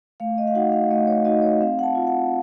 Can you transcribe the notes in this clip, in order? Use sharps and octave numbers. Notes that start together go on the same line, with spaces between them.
A3 F5
D#5
F5
D#4 F#4 F#5
F5
A3 D#5
C#5
D#4 F#4 D#5
C#5
C4 F5
F#5
A5
F4
F#5